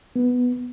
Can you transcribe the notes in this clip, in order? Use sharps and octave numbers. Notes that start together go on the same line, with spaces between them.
B3